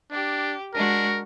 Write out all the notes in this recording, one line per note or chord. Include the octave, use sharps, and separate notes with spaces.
D4 G4
G#3 D4 F#4 A#4